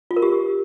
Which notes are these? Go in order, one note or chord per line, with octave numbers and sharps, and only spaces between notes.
F4
A#4
G4